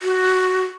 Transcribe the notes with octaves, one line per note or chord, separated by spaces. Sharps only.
F#4